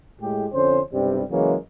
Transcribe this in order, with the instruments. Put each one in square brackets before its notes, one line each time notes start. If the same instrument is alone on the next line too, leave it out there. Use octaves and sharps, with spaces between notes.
[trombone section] A2 G#3 G4
F2 D3 C#4 C5
B1 G2 C3 G3
C#3 E3 F#3 G#3 A#3 C#4